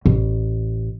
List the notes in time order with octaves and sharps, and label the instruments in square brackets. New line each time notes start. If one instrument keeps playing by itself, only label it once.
[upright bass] A1